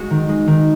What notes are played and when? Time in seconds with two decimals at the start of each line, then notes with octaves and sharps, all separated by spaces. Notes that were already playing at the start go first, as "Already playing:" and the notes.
Already playing: G#3 F#4
0.10 D#3
0.29 G#3
0.48 D#3